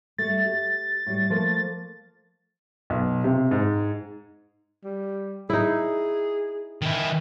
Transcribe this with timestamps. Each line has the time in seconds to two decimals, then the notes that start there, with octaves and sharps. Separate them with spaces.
0.18 G3 A3 A6
0.46 G4
1.07 A2 G3
1.30 F3 A3 A#3
2.90 B1
3.24 C3
3.51 G#2
4.84 G3
5.50 D#4 E4 G#4
6.82 D#3 E4